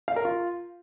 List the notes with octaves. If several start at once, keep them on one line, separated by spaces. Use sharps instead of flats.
F5
A#4
F4